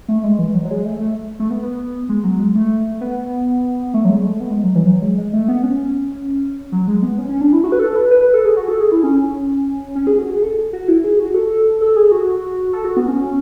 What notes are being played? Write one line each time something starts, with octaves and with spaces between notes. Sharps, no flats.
A3
G#3
E3
F#3
F#3
G#3
A3
A3
A3
B3
B3
G#3
F#3
G#3
A3
B3
A3
F#3
G#3
A3
B3
G#3
F#3
E3
F#3
G#3
G#3
A3
B3
C#4
F#3
G#3
B3
C#4
C#4
D4
E4
F#4
B4
A4
B4
B4
B4
A4
G#4
F#4
A4
G#4
E4
C#4
C#4
G#4
F#4
G#4
A4
F#4
E4
G#4
F#4
A4
A4
G#4
F#4
A4
F#4
B3
C#4